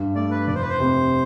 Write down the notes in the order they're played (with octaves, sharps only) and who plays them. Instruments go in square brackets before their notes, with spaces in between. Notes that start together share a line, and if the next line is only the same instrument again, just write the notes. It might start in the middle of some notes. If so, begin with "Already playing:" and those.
Already playing: [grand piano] G2
[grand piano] A3 [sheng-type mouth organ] D5
[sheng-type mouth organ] B4
[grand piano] F1 [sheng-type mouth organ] D5
[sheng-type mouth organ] C5
B4
C5
[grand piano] C3